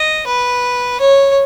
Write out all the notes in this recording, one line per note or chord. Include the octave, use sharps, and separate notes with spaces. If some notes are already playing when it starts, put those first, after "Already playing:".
Already playing: D#5
B4
C#5